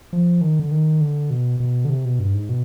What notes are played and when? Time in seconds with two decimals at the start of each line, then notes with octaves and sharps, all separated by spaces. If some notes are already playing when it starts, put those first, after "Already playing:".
0.13 F3
0.41 D#3
0.60 D3
0.71 D#3
1.01 D3
1.30 B2
1.60 B2
1.85 D3
1.90 C3
2.05 B2
2.19 G2
2.34 G#2
2.49 B2